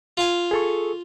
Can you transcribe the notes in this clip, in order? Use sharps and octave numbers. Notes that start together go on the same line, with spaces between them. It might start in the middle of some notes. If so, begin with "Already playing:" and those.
F4 F5 G#5
G#4 A4 C#6